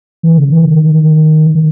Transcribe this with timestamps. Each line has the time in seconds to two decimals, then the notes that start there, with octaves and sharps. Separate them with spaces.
0.23 E3
0.38 C#3
0.52 E3
0.67 D#3
1.55 D#3